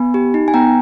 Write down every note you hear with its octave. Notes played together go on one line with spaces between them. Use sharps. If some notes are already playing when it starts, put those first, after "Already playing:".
Already playing: B3 G#5 B5
G4
D#4
G#5
B3 G5 A#5